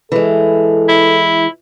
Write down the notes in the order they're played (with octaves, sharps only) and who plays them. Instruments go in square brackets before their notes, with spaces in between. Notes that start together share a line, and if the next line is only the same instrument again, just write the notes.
[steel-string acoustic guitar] E3 G#3 [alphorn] A4
[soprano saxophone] E4